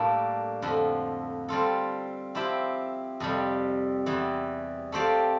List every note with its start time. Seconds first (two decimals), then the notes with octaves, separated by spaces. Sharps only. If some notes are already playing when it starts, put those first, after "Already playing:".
Already playing: A2 G3 A#3 D4 A4
0.62 F2 D3 F3
1.49 G3 C4 F4 A4
2.35 F3 C4 E4 G4
3.20 F2 C3 G3
4.06 E2 E3 G3
4.92 A3 C4 G4 D5 F5